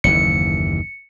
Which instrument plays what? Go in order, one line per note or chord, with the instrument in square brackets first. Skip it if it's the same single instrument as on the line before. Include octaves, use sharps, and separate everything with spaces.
[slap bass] F#1 D#2 E3 [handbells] C#7